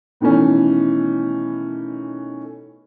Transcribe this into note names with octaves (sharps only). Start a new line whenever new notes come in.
B2 D#3 E3 A3 C#4